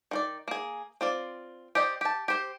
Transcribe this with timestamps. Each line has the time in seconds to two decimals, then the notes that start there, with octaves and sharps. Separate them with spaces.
0.11 D#3 F4 D5
0.48 A#3 G#4
1.01 C4 F4 D5
1.75 G4 C5 D5 D#5
2.01 G4 A5
2.28 G4 C5